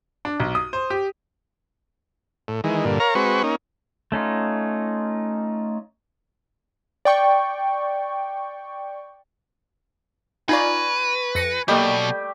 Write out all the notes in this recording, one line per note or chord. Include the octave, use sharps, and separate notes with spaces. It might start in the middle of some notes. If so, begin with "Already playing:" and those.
D4
B1
D#6
C5
G4
A2
D#3 E3 G#3
G2 A#2 D3
A#4 C#5 F5 A#5
G#3 C4 F#4 B4 C#6
A#3 C#4 D#4
A3 C#4 D#4 F4
D5 G5 C#6
D#4 F4 B4 D5 G#5 A#5 C#6
F2 A#6 C#7
B2 F#3 G3 A3 A#3 G4 D#5